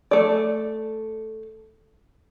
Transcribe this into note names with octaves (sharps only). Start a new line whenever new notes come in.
A3 D5